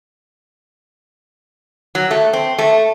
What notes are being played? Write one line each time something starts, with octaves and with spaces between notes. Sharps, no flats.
F#3
A3
C4
A3